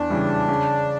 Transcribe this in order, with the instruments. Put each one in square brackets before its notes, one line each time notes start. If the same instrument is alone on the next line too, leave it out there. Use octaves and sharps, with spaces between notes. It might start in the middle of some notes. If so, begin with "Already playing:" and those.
Already playing: [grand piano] E2 [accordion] D4
[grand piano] C#3 E3 G3
C#3